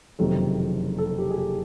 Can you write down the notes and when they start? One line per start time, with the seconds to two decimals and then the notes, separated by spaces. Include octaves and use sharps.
0.19 F#1 F2 C3 D#3 F#3 A4
0.98 A4
1.18 G4
1.31 G#4
1.38 G4